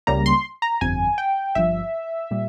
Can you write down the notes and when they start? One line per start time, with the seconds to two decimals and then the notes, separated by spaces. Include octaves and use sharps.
0.07 C#2 C#3 G3 A#3 A#5
0.26 C6
0.62 A#5
0.81 G1 F2 C3 G#5
1.18 G5
1.55 G1 G2 F3 E5
2.31 A#2 G3